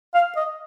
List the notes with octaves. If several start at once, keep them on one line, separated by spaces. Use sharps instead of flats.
F5
D#5